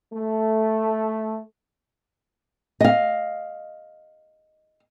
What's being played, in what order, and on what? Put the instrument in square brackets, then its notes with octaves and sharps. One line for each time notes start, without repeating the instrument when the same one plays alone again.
[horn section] A3
[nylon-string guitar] D#5 F5